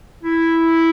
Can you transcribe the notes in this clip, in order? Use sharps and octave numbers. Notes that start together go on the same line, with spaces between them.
E4